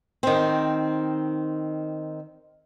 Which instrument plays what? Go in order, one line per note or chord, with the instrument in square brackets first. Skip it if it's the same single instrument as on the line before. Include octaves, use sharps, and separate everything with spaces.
[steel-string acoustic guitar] D#3 C4